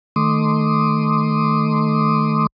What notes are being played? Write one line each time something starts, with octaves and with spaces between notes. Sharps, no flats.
D#3 A3 C6 D6 D#6